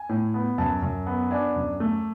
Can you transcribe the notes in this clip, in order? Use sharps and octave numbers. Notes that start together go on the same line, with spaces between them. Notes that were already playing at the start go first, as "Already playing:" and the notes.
Already playing: G#5
A2
B3
F#2 A5
F#2
B3
D4 G#5
F#2
A3